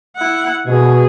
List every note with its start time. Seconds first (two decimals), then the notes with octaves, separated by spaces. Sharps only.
0.17 E4 F#5
0.67 B2 G#4